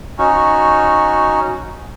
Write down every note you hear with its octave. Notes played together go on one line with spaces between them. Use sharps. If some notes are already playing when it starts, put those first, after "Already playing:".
C#4 D#4 F#4